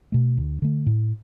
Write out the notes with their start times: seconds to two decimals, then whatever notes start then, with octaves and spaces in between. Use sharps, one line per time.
0.12 B2 A3
0.37 D2
0.62 D3 A3
0.86 A2